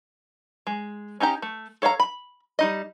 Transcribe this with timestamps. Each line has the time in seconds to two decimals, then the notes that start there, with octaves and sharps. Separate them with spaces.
0.67 G#3
1.20 C#4 D#4 G4 A#5
1.42 A3
1.82 A4 C#5 F5 F#5 A#5
2.00 B5
2.59 G3 D#4 D#5